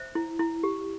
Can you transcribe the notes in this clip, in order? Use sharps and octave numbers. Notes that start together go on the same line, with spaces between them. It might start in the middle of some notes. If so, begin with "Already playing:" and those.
Already playing: C5 E5
E4
E4
G4